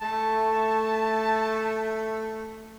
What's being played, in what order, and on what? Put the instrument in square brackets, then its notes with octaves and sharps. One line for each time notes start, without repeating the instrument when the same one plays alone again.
[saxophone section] A3 [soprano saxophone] A5